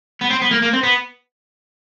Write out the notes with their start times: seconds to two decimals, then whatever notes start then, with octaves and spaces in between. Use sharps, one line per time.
0.22 B3
0.31 C4
0.42 B3
0.51 A#3
0.63 A#3
0.73 C4
0.83 B3